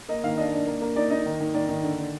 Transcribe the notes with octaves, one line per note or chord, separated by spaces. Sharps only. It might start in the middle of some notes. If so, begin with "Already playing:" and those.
A#3 D#5
D#3 F5
D4 D#5
D4
A#3
A#3
D#4 D5
D#4 D#5
D#3
D#3
D#3 D5
D#3
D3
D3